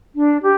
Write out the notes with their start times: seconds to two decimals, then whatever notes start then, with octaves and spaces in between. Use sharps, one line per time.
0.15 D4
0.43 G4